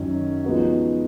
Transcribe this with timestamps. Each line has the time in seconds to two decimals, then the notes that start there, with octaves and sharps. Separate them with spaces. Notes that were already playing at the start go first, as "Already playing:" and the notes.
Already playing: F#2 D#3 F#3 C#4
0.44 F3 G#3 B3 D#4 F#4